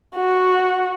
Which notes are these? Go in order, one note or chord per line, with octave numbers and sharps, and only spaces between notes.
F#4